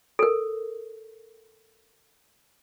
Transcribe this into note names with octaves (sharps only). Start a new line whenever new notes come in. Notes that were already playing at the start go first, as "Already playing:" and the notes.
A4 A#4